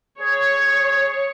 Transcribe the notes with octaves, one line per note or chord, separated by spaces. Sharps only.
G#4 C#5